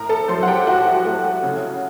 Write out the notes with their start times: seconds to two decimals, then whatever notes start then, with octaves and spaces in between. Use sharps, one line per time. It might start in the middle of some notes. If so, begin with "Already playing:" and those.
Already playing: A2 A#4 A#5
0.09 A4 A5
0.28 F#3 C5 C6
0.43 F#5
0.47 G4 G5
0.67 A2 F#4 F#5
1.05 A3
1.43 C#3